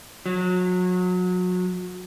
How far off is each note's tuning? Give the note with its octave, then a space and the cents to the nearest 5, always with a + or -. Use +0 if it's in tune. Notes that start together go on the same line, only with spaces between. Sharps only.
F#3 -30